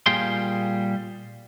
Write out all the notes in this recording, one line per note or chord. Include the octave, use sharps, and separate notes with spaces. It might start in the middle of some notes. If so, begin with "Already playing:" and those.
A#2 G3 G#4 F5 G5 C6